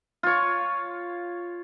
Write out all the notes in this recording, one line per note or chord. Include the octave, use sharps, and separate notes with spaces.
F4 C#5